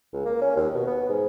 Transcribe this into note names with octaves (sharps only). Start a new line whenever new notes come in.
C#2
A#3
C#4
D#2
B2
B3
G#2